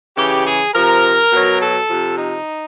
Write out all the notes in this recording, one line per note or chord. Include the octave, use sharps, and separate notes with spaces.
C#3 E3 G4
G#4
C3 F3 A#4
B2 F#3
A4
C3 F3
D#4